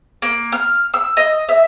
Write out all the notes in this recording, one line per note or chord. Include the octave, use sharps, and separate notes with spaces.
A#3
F6
E6
D#5
E5